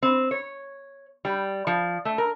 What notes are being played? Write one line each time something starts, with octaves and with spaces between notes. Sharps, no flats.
C4
C#5
G3
F3
A3
A#4